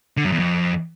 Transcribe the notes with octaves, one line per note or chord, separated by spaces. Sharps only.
D3
F#2
E2
F2